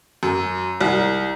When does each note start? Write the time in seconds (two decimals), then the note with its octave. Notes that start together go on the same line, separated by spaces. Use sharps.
0.23 F#2
0.81 C2